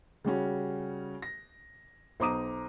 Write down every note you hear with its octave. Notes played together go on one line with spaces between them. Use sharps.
C#3 G3 C#4 F#4
A#6
B1 C5 A#5 D6 D#6 D#7